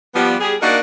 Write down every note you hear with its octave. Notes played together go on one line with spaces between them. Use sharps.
F3 G3 B3
G3 G#4
A#3 D4 D#4 F#4 A#4 D5